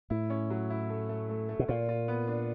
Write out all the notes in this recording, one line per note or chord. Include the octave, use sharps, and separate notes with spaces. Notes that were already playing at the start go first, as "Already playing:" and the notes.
A2 E4
C#4
F#3
E4
A3
A3
A3
A3
B2
A#2 F4
F4
B3
D4